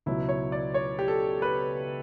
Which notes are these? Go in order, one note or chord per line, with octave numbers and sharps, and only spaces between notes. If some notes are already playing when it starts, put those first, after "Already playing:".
C#2 B2 F#3 E4
C#5
D5
C#5
G4
A4
B4